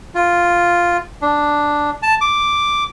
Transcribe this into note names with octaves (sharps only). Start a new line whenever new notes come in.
F4
D4
A5
D6